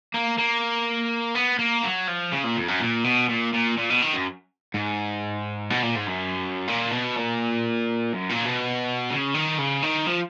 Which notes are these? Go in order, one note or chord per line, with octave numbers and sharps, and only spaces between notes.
A#3
A#3
B3
A#3
F#3
F3
C#3
A#2
F2
F#2
A#2
B2
A#2
A#2
A#2
B2
D#3
F#2
G#2
B2
A#2
G#2
F#2
A#2
B2
A#2
F#2
A#2
B2
C#3
D#3
C#3
D#3
F3